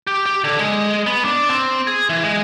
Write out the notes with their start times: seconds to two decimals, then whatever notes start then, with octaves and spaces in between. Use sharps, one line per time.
0.07 G4
0.26 G4
0.44 D3
0.59 G#3
1.06 B3
1.25 D4
1.50 C4
1.87 G#4
2.09 E3
2.24 G#3